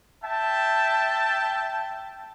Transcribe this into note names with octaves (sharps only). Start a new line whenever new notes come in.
E5 G5 A5